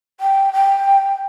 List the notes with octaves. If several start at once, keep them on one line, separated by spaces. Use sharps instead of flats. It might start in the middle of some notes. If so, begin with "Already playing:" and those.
G5
G5